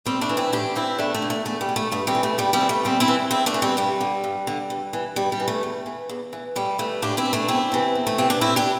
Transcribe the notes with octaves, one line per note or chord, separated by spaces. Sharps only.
A2 G3 C4
A3 D4
E3
C4 E4
A2 D4 G4
E3 C4 E4
E2 A3 D4
A3
D3
A3
E2 A3
G3
D3
A3
G2 A3
G3 C4
E3
A3
G2 G3
G3 C4
E3
A3
E2 G3 C4
C4 E4
E3
E2 C4 E4
A3 D4
E3
G3 C4
G2 G3
D3
G2
D3
G2
E3
G2 G3
G3
E3
A3
E2
E3
E2
E3
A2 G3
E3 A3
A2 D4 G4
C4 E4
E3
A3 D4
E2 C4 E4
C3 E3
E2
A3
C3 E3 C4
D4
A2 C4 E4
D4 G4